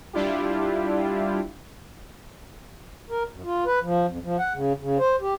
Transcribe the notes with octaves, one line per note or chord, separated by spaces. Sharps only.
G3 D4 E4 F4 G4
A#4
F#2
F4
B4
F3
F2
F3
F#5
C#3
C#3
C5
G4